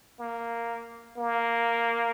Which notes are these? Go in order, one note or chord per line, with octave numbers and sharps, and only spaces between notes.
A#3
A#3